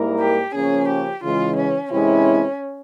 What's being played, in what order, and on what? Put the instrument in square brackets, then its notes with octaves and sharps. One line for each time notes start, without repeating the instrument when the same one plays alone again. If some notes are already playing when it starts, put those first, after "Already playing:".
Already playing: [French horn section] G#2 G3 A#3 E4 A#4
[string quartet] G4
[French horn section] C#3 F3 A#3 C#4 [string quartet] G#4
[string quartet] G4
[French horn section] C#3 E3 G#3 [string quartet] F4
[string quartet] C#4
[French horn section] C3 E3 G#3 C4 E4 [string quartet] C#4